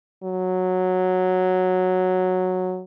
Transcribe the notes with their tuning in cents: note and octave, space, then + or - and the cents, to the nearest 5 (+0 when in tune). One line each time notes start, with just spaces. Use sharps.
F#3 -5